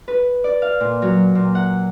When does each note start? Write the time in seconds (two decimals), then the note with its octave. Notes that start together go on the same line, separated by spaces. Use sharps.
0.08 B4
0.44 D5
0.62 F5
0.80 A#2
1.02 F#3
1.35 A#2
1.55 F#5